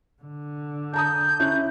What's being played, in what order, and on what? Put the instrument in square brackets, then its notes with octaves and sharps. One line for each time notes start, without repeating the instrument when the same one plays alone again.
[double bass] D3
[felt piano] A5 A#5 D#6 [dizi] G6
[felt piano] C#4 E4 F#6